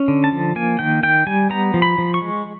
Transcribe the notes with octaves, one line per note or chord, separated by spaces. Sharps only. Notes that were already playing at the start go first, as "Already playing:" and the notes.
Already playing: C#4
D3
A5
F3
A#3 G#5
D#3 G5
D#3 G5
G3 G#5
B3 A#5
F3
B5
F3
C#6
G#3